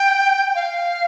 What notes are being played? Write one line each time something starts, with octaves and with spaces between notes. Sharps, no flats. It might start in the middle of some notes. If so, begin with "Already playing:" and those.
Already playing: G5
F5